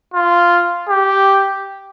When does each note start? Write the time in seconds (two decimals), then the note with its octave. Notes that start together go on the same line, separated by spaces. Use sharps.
0.14 F4
0.89 G4